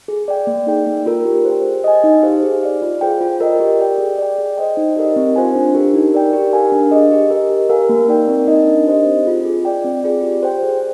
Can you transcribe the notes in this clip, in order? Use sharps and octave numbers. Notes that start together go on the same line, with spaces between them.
G#4
D5 G5
A#3
D#4 G#4 D5 G5
A#3
F4 A#4
G4
C5 G5
G#4
D#5 G#5
D#4
G4 C5 F5
G#4
D5 F5
F4
G#4 C5 G5
F4
A#4 D#5 G5
G4
D5 G5
G#4
D5 G5
G#4
C5 D#5 G5
D#4
G4 A#4 D#5
C4
F4 C5 F5 G#5
D4
G4 A#4
D#4
A#4 D5 G5
G4
A#4 F5 G#5
D4
G#4 D#5
G4
A#4 D#5
G4
A#4 F5 G#5
A#3
D#4 A#4 D5 G5
C4
D#4 A#4 D#5
D4
G4 C5 D#5
C4
F4 G#4
G#4
D5 G5
C4
F4 G#4 D5
G4
C5 G5
G#4